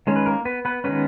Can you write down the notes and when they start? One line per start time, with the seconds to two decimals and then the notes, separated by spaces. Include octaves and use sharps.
0.07 D#3 G#3 C#4
0.16 B4
0.26 A#3 A#4
0.45 B3 B4
0.65 B3 B4
0.84 D#3 G#3 B3 C#4 B4